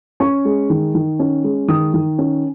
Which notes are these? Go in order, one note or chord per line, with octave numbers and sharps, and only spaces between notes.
C#4 C#6
G#3
D#3
D#3
C#4
G#3
D#3 D#6
D#3
C#4